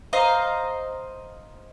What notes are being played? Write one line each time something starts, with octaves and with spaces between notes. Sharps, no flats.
C5 D#5 F5 A#5